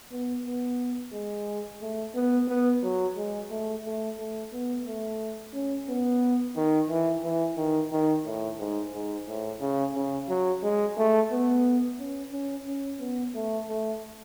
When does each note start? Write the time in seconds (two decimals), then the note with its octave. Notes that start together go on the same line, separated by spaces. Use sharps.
0.12 B3
0.46 B3
1.13 G#3
1.82 A3
2.15 B3
2.48 B3
2.83 F#3
3.17 G#3
3.51 A3
3.85 A3
4.19 A3
4.53 B3
4.86 A3
5.54 C#4
5.89 B3
6.56 D#3
6.90 E3
7.24 E3
7.57 D#3
7.92 D#3
8.26 A2
8.59 G#2
8.94 G#2
9.28 A2
9.61 C#3
9.95 C#3
10.29 F#3
10.63 G#3
10.97 A3
11.32 B3
11.99 C#4
12.32 C#4
12.67 C#4
13.00 B3
13.35 A3
13.69 A3